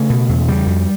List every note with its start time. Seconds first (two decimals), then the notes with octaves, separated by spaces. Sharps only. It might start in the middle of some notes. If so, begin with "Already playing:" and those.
Already playing: C#3 A3
0.10 B2
0.29 E2
0.48 C#3 G3
0.66 F2